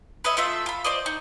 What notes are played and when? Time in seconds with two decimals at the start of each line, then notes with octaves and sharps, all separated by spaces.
0.24 B4 C#5 D#5 E5
0.37 A3 F4 E5
0.66 F4 B5
0.84 C5 D5 D#5
1.06 D#4